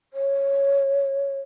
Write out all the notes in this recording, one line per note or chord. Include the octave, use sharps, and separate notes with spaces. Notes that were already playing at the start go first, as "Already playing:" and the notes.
C#5